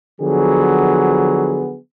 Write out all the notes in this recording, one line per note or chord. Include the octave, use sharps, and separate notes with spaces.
D3 F3 F#3 B3 G#4